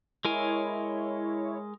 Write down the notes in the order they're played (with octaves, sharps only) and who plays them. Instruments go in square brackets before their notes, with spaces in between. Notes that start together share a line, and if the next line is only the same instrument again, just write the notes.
[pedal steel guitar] G#3 A#4 G#5 [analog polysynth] E4 C#5